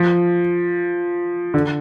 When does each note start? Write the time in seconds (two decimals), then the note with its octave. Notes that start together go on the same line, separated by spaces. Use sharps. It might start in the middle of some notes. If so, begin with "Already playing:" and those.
Already playing: F3
1.54 D3